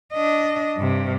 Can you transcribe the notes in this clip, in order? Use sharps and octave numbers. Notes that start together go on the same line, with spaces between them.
D4 D#5
G2 C3